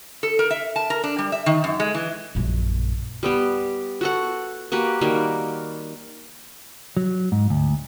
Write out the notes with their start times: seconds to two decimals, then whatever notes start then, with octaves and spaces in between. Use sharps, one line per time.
0.23 A4
0.39 A#4
0.50 E5
0.76 A5
0.90 A#4
1.04 D4
1.18 G3
1.32 E5
1.46 D#3
1.64 F#2
1.80 G#3
1.94 E3
2.35 A#1 F#2
3.23 G3 B3 G4
4.01 F#4 A4 F#5
4.72 A#3 F#4 G4 B4
5.01 D#3 G3 A#3 F#4
6.97 F#3
7.32 G#2
7.50 D2